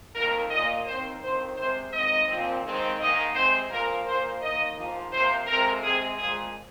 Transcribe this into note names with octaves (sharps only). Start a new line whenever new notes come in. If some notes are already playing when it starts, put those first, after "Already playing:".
F2 D#3 A#3 A#4
A#2 A#3 D#5
D#2 D#3 C4 C5
F2 D#3 C4 C5
C3 G#3 C4 C5
D#2 D#3 G#3 C4 D#5
A#2 F3 C4
D#2 D#3 G#3 C4
G#2 D#3 A#3 D#5
C3 G#3 C4 C5
A#2 F3 A#3 A#4
A#2 F3 A#3 C5
D#2 D#3 A#3 D#5
G#2 F3 A#3
C3 F3 A#3 C5
F2 C3 G#3 C4 A#4
C3 G#3 C4 G#4
A#2 F3 G#3 G#4